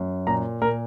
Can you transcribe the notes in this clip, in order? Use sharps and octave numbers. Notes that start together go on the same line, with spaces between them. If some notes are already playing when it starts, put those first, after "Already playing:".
Already playing: F#2
A#2 A#5
A#2 A#4